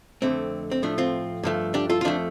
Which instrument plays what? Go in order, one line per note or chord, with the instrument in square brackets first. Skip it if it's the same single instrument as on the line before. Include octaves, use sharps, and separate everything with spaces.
[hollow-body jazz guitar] F2 D3 A3 C4
C4
A2 F3 A3 D4
C4 F4
G2 F3 A3
D4 G4
F4 A4
F4
F2 F3 A3 D4